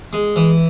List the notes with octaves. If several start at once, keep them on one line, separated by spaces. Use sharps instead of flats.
G#3
E3